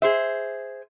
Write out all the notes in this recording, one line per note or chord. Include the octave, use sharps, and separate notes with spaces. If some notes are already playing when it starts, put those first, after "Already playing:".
G#4 C5 E5